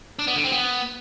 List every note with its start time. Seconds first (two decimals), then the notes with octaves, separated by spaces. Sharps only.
0.19 D4
0.27 B3
0.36 D3
0.44 C4
0.52 B3